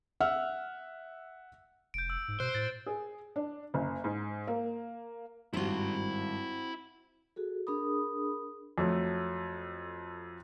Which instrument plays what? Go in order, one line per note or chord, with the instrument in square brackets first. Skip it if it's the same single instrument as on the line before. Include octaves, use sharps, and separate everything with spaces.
[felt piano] E5 F#5 E6 F6
[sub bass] F1 [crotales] G6 D7
[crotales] E6
[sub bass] G#2
[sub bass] B2 [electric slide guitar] C5 [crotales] F#6
[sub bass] A2 [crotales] A6
[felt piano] G#4
D4
F#1
G#2
A#3
[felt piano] G#1 G2 [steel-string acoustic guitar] C4 F#4 [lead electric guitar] E4 C6
[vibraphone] F#4 G#4 A4
D4 G#4 A#4 B5 D#6
[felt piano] F2 F#3 A3